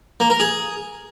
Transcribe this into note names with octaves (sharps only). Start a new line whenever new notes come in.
A#3
A#4
G#4